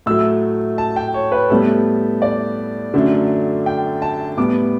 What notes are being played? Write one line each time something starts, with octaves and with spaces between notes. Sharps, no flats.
A2 F#3 A3 E6
A5
G5
C#5
B4
A2 G3 B3 A4
D5
F#2 D3 F#3 A3
G5
A5
A2 G3 B3 D6